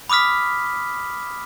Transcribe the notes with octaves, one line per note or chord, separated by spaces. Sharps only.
B5 D6 D#6 F6 B6